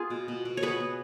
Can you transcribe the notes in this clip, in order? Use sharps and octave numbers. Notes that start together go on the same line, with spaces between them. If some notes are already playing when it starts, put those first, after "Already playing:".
Already playing: B3 F4 G#4
B2
B2
B2
C#5
B3 G#4 B4
B3